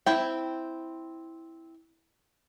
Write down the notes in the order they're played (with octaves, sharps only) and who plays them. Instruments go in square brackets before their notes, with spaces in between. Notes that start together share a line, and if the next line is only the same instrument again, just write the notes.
[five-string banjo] C4 E4 G5